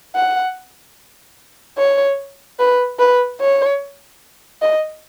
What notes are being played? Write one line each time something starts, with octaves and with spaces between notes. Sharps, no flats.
F#5
C#5
B4
B4
C#5
D#5